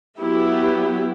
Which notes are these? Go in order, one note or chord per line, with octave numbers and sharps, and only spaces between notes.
F#3 B3 E4 G4